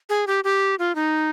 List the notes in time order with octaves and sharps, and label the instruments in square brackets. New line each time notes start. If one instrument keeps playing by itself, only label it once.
[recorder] G#4
G4
G4
F4
D#4